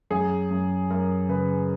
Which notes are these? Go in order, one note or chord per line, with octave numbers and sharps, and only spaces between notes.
F#2 G#4
F#2
F#2 A#4
C#3 B4